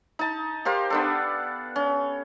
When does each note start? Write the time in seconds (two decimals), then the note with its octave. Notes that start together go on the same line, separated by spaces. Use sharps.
0.19 D#4 A5
0.65 G4 A#4 C5 F5
0.90 B3 D4 A4
1.76 C#4